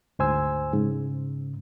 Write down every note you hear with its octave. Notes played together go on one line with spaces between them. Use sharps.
D2 G#2 C5 G#5 E6
G#2 C#3